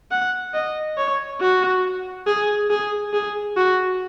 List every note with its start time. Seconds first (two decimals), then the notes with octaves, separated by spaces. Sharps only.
0.12 F#5
0.54 D#5
0.98 C#5
1.41 F#4
2.27 G#4
2.70 G#4
3.13 G#4
3.56 F#4